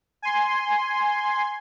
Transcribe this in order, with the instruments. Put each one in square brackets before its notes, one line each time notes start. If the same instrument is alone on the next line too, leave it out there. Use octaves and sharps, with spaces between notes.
[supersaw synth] G#5 C6